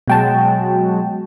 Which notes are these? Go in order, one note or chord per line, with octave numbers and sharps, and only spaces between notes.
B2 F#3 G#3 F#4 G5 A5